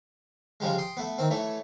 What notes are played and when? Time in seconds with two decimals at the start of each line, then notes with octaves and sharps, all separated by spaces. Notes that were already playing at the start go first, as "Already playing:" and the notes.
0.60 C#3 F3 G3 G#3
0.78 G5 C6 D#6
0.97 A3 B3
1.18 D#3 C4
1.30 E3 A3 C#5